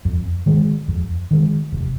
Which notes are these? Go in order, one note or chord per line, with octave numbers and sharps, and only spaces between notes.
F2
D#3 G#3
F2
D#3 G#3
F1